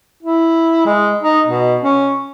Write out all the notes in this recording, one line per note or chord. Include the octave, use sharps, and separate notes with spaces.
E4
G#3
D#4
B2
C#4